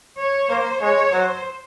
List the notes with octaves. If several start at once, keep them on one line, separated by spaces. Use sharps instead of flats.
C#5
A#3 C5
G#3 C#5
F#3 C5